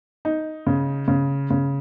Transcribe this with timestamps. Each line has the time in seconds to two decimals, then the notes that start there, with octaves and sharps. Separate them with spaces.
0.25 D#4
0.67 C#3
1.08 C#3
1.50 C#3